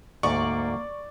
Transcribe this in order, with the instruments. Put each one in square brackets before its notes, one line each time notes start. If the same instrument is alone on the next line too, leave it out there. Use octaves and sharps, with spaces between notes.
[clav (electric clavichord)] D2 G#2 [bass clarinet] A#3 [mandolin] D5 [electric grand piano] C#6